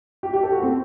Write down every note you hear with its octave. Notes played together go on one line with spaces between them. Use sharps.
G4
G4
A4
F#4
C4